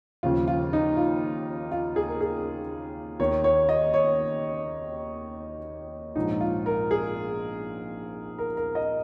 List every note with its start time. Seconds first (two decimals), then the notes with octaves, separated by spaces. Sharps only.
0.23 D#2 C#3 F3 F4
0.48 F4
0.73 D#4
0.97 F4
1.72 F4
1.96 G#4
2.08 A#4
2.21 G#4
3.20 D#2 D#3 C#5
3.44 C#5
3.69 D#5
3.94 C#5
6.15 A#1 G#2 F3 D#4
6.41 F4
6.66 A#4
6.91 G#4
8.39 A#4
8.57 A#4
8.75 D#5